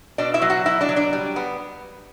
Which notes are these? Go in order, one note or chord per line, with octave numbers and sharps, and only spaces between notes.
B2 D4 D5
E4 E5
F#3
F#4 F#5
B2 E4 E5
D4 D5
F#3
D4 D5
G3
B3